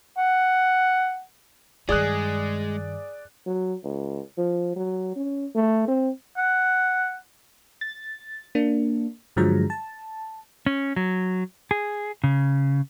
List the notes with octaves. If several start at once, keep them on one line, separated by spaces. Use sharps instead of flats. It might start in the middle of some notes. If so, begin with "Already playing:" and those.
F#5
G2 D#3 G#3 G#4 D5 D#6 F#6
F#3
C#2
F3
F#3
C#4
A3
C4
F#5
A6
A#3 D4
G2 D3 F3 F#3 G#3 A#5
A5
C#4
F#3
G#4
C#3